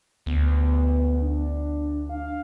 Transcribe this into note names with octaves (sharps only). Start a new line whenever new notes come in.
D2 B3
D4
F5